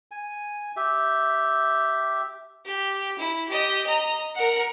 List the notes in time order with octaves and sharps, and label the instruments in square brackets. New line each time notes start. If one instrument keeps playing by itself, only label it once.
[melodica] G#5
G4 E5
[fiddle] G4
E4
G4 D#5
D#5 A#5
A#4 F#5